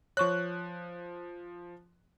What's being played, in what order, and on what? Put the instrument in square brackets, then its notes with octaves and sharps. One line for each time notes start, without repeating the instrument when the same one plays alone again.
[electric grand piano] F3 F#6 [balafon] C#5 C#6